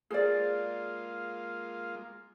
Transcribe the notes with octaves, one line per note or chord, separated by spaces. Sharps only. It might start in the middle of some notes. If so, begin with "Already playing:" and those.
G#3 A#3 F4 G#4 C5 D5